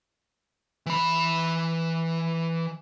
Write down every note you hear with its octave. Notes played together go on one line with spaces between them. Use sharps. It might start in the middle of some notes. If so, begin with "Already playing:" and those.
E3 B5